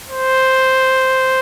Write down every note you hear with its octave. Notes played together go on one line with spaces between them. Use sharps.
C5